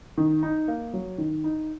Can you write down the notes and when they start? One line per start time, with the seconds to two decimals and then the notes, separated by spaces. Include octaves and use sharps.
0.18 D#3
0.43 D#4
0.68 A#3
0.93 F#3
1.18 D#3
1.44 D#4